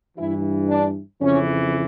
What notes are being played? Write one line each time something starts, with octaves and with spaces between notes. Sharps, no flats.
G2 E3 E4
D4
F2 C#3 E3 C#4